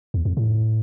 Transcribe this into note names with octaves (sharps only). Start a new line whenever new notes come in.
E2
F2
A2